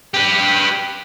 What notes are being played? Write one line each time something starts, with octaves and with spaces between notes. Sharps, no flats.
G4 B4